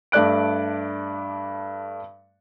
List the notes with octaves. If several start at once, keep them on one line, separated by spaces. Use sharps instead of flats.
G2 A3 D5 F#6 D7